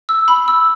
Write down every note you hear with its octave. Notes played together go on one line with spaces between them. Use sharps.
E6
B5
E6